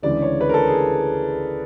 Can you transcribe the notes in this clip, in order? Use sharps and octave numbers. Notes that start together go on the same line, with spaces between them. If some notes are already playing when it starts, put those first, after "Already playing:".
D2 C#3 E3 G#3 D5
C#5
B4
A#4
A4
G#4